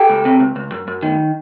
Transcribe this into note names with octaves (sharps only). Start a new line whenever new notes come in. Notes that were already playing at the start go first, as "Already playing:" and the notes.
Already playing: G4 A4
C#2
C3
C#2
C#2
F#2
F#2
D#3